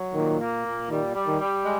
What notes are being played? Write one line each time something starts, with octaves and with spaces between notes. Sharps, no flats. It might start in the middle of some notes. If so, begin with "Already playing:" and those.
Already playing: F#3
A#2 D#3
A#3
A#2
D#3 G3
G3
D#3
G3
G#3